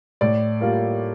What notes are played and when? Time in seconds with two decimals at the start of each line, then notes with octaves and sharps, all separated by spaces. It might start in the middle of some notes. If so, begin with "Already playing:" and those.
0.21 A2 D5
0.61 G3 A#3 F4